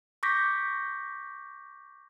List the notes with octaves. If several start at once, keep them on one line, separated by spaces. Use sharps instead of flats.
C#6 D6 G6 A#6 B6